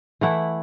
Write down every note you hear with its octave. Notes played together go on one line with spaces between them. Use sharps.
E3 A3 E4 F#5